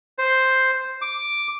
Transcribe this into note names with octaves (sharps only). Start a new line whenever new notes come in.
C5
D6